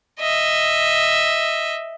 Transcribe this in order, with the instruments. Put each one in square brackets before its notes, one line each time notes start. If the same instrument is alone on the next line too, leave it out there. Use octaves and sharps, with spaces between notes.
[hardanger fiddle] D#5 E5